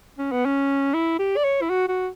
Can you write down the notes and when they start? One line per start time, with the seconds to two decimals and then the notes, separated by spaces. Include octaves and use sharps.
0.19 C#4
0.32 B3
0.45 C#4
0.94 E4
1.19 G4
1.37 D5
1.44 C#5
1.62 E4
1.69 F#4
1.88 F#4